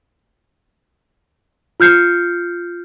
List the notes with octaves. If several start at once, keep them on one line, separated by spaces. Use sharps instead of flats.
F4 F6 G6 C7 C#7